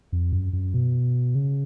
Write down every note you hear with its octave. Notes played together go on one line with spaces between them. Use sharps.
F2
F#2
F#2
B2
C#3